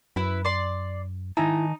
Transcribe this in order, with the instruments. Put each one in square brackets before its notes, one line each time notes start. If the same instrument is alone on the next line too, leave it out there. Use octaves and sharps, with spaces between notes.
[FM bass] F#2 [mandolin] E4 B4 B5
[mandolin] D5 C6
[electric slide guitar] D#3 G#5 A5 [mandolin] D#4 [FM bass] E4